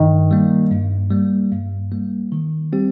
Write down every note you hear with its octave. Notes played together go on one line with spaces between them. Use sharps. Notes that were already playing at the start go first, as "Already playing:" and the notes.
Already playing: G2 D#3
G3 A#3
G2
G3 A#3
G2
G3 A#3
D#3
G3 C4 G4